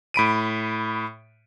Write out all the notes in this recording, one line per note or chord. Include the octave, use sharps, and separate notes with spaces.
A2 B5 D7 D#7